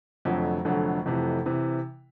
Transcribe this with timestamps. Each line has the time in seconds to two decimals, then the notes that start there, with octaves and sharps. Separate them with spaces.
0.25 F1 F2 D3 F#3
0.65 F1 F2 D3 F#3
1.06 F1 F2 C3 E3
1.46 C3 E3